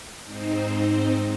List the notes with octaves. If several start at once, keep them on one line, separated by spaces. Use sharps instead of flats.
G#2 C4 D#4 C5